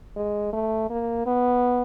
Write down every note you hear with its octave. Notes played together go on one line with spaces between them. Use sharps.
G#3
A3
A#3
B3